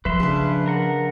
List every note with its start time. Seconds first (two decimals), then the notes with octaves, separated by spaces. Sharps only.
0.05 F3 B4 E5 C6
0.20 C#3 D4
0.67 A#4 F#5